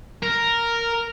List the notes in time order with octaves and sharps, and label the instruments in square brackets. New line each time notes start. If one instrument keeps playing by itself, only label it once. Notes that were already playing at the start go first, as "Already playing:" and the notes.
[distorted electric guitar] A#4